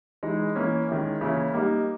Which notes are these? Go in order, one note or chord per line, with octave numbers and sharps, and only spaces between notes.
E3 G#3 D#4
E3 A#3 C#4
D#3 G#3 C#4 E4
C#3 E3 A#3 C#4 E4
G3 A#3 D#4